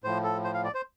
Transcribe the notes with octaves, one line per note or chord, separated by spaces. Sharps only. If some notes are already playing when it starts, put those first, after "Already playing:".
A2 F3 C5
A4
C5
F5
D5
C5